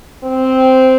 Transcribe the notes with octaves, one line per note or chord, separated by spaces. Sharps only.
C4